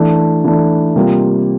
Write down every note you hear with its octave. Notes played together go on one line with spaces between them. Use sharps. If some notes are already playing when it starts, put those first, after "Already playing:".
Already playing: E3 A3 D4
E3 A3 D4
C3 G3 A#3 F4